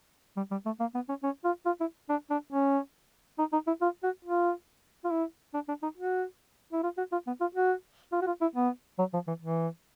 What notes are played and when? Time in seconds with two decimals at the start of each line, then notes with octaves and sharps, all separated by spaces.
0.37 G3
0.51 G3
0.66 A3
0.80 A#3
0.95 B3
1.09 C#4
1.23 C#4
1.45 F4
1.66 F4
1.81 E4
2.09 D4
2.30 D4
2.53 C#4
3.39 D#4
3.53 D#4
3.67 E4
3.82 F4
4.03 F#4
4.25 F4
5.05 F4
5.11 E4
5.54 D4
5.68 D4
5.83 D#4
5.98 F#4
6.73 E4
6.83 F4
6.98 F#4
7.12 F4
7.27 B3
7.41 F4
7.55 F#4
8.12 F4
8.22 F#4
8.27 F4
8.42 E4
8.56 B3
8.99 F#3
9.13 F3
9.28 E3
9.42 E3